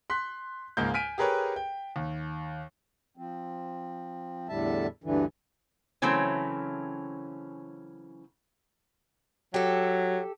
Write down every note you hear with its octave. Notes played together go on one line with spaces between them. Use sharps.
C6 F#6 B6
C#2 G#2 G#3 A#3 G6
G#5 F6 B6 D7 D#7
G4 G#4 A#4 B4 C#5
G5
D#2
F3 C4
E2 A2 D3 G3 E5 A5
D2 G2 D3 E3
C#3 E3 F#3 A3 C4 C#4
F#3 G4 A4